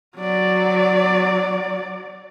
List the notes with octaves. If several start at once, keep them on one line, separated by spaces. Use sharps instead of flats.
F#3 D5